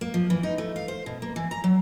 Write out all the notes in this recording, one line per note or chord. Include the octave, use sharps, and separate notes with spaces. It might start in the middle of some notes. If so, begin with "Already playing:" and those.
A#3
F3
E3
D#4
A3
F5
C5
B2
A#3
E3
A#5
F#3